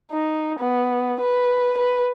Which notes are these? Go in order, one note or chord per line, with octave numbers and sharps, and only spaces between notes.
D#4
B3
B4
B4